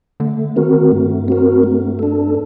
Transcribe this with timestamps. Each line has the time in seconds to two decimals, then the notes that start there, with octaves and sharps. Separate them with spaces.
0.20 D3 A3
0.56 D#3 C4 F#4 A#4
0.92 G2 A3
1.28 C4 F#4 A#4
1.63 A3
1.99 D4 A4